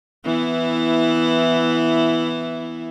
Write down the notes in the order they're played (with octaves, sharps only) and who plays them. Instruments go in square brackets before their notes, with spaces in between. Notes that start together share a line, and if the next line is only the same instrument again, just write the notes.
[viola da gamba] E3 B3 E4